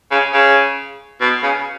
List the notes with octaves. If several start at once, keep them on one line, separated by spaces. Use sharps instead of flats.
C#3
C#3
B2
C#3